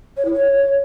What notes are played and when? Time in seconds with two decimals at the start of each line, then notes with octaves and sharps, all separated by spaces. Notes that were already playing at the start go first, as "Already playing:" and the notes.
0.16 C#5
0.24 E4
0.32 C#5